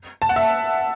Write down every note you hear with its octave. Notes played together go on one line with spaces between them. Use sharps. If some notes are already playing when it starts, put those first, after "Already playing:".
A5
F#5
E5